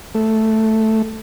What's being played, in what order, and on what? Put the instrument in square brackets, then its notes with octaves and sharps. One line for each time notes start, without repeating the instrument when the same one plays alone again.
[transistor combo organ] A3